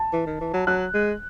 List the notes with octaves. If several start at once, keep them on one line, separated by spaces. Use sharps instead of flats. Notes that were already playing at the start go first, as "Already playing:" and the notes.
Already playing: A5
E3
D#3
E3
F#3
F#3 F#6
G#3